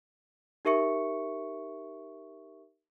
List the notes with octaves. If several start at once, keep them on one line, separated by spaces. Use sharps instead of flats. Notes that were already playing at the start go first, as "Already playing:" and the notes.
D#4 G4 A#4 E5 C#6 C#7